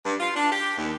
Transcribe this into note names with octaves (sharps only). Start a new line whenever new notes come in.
G2
F4
D4
G4
D#2